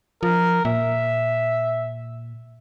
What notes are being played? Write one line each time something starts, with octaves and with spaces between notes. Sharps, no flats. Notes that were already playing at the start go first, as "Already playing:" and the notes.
F3 A#4
A#2 E5